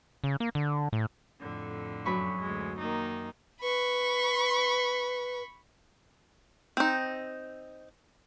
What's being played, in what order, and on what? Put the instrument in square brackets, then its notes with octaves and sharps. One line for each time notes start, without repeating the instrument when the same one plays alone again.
[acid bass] C#3
A#3
D3
A2
[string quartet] F2 A2 D3
[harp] F#2 B5 C#6
[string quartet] D2 G#3
D#3 A#3 D#4
[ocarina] B4 [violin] B5 C#6
[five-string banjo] C4 D#4